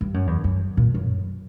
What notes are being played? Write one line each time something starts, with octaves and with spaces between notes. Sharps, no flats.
G2
F#2
E2
F#2
A#2
F#2